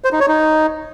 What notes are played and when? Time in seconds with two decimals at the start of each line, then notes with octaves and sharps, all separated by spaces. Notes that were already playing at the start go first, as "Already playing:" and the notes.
0.04 C5
0.12 D#4
0.20 C#5
0.28 D#4